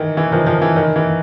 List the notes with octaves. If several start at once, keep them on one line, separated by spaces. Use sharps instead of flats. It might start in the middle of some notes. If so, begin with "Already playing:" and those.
Already playing: D#3 E3
E3
D#3 F3
D#3 F3
E3
D#3
E3